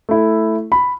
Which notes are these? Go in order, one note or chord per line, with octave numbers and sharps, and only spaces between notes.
A3 E4
B5